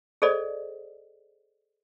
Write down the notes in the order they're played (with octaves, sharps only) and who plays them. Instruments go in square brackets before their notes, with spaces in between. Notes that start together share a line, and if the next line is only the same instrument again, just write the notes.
[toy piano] G#4 A4 C5 D5 D#5